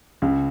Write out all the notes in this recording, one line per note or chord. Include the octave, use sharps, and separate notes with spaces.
C#2 C#3